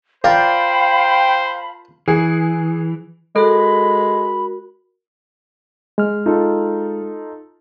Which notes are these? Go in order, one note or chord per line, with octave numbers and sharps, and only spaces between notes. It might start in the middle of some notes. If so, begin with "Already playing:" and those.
F4 A#4 C5 D5 F5 G5 A5 B5
E3 G#4
G#3 F#4 A4 A#4 B5
G#3 F6
D#4 F4 A4